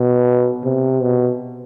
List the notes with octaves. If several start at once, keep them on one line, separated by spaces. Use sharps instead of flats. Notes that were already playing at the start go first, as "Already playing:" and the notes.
Already playing: B2
C3
B2